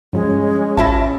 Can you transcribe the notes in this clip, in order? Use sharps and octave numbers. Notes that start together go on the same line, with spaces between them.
G2 F3 G#3 C#4
A1 E4 F4 E5 A5 A#6